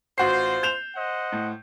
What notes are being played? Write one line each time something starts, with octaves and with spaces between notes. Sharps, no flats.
A1 F4 F#4 C5 C7
G6 E7 F7
C5 D#5 F#5
A2